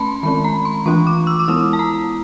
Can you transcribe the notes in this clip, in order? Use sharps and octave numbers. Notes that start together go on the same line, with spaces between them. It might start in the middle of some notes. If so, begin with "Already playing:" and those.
Already playing: A3 C#4 A5 B5 C6
D#3 G#3 C4 B5
A#5
C6
E3 A3 D4 F4 C#6
D6
E6
D6
G#3 B3 E4 D#6
A5
A#5